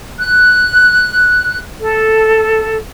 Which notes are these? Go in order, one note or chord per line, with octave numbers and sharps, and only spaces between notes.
F#6
A4